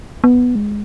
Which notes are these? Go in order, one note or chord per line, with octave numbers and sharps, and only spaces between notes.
B3
G#3